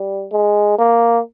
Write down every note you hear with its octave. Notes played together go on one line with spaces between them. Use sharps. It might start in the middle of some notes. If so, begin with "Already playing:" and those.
Already playing: G3
G#3
A#3